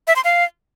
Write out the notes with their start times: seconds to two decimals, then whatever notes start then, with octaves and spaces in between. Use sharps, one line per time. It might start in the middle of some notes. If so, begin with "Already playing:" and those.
0.07 E5
0.16 C6
0.24 F5